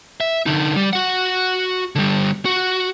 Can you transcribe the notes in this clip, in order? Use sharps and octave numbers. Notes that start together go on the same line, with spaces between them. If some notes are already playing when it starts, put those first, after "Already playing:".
E5
D3 D#4
G3
F#4 F#5
D3 G3
F#4